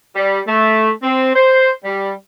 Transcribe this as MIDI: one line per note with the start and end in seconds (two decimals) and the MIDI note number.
0.15 0.40 55
0.46 0.90 57
1.02 1.34 60
1.34 1.70 72
1.84 2.13 55